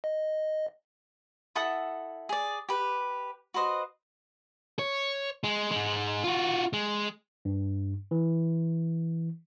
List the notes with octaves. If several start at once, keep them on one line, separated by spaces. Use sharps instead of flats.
D#5
E4 A4 F#5 D#6
G#4 D5
G4 B4
F#4 B4 C5 D#5
C#5
G#3
G#2 G#3
F4 F#4
G#3
G2
E3